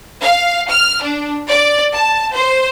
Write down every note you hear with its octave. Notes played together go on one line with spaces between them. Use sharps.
F5
F6
D4
D5
A5
C5